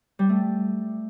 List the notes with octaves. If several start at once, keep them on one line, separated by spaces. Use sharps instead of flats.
G3
A3